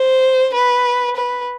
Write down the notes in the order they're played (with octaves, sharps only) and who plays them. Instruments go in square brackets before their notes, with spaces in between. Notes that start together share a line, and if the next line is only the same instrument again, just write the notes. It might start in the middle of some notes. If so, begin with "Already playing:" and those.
Already playing: [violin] C5
B4
B4